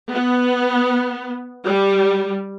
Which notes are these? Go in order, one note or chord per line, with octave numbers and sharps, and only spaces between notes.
B3
G3